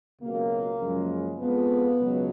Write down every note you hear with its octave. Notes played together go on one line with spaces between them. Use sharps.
C#2 B2 F#3 A#3
F#2 C#3 F3 G#3
F2 F3 G#3 B3
C#2 B2 F#3